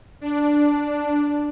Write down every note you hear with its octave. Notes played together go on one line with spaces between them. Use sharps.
D4